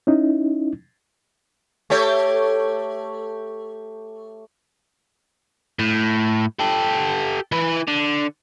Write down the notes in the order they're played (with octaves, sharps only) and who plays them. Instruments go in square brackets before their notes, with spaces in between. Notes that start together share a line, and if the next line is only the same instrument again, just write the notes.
[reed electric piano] C#4 D#4 E4
[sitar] A3 G4 C#5
[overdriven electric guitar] A2
G4 A4
E3 B4
D3